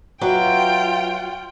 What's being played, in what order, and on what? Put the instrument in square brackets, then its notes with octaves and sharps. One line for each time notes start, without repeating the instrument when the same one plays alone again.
[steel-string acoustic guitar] F#3 B4 E5 [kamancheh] F4 G5